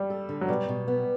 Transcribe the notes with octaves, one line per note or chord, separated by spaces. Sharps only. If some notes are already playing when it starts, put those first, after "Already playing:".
Already playing: G3
A4
D3
F#3
B2 G3
B2
B3